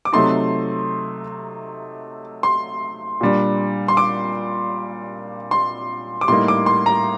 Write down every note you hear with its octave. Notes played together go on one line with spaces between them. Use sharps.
D6
C3 F#3 A3 D#4 C6
C6
A#2 G3 D4
C6
D6
C6
D6
A2 G3 A#3 D#4 C6
D6
C6
A#5